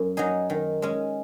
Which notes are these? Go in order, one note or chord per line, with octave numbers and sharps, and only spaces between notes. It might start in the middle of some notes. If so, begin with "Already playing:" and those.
Already playing: F#2
F#3 D#4 G#4
D#3
G#3 C#4